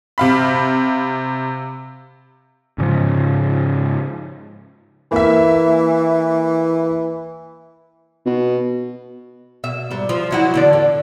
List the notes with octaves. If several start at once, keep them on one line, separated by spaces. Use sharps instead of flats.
C3 F5 B5
G#2 C#3 F3
E3 A#3 E5
B2
B2 E5
G#2 G3
F3
F#3 E4 F#4
E2 D3 D5
A2